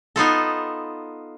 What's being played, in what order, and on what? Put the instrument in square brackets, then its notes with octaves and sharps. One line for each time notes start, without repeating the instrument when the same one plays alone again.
[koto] B3 D#4 F4 A4